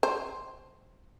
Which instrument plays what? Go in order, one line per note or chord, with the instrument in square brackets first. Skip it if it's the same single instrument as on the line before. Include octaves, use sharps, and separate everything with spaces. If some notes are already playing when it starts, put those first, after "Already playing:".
[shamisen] C5